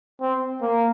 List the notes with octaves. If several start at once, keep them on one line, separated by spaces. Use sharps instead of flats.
C4
A#3